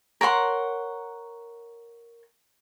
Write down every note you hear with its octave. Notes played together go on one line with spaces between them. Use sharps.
A#4 C#5 F#5 C6